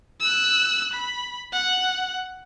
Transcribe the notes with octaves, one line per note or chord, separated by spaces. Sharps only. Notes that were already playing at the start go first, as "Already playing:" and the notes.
E6 F#6
B5
F#5